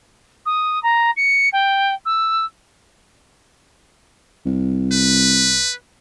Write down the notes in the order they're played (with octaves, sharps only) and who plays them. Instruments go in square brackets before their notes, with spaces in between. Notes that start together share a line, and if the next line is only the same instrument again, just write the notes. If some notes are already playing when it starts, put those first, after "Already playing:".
[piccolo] D#6
A#5
C#7
G5
E6
[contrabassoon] C2
[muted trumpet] B4